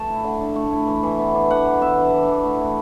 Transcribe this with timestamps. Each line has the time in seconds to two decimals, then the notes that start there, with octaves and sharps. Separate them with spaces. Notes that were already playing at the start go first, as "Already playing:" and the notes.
Already playing: A3 A5
0.10 E4
0.24 D3
0.40 D3
0.56 A3
0.72 E4
0.87 E3
1.03 E3
1.19 B3
1.35 D4
1.51 E3 F#5
1.66 E3
1.81 B3 E5
1.97 D4
2.13 E3
2.29 E3
2.44 A3
2.60 E4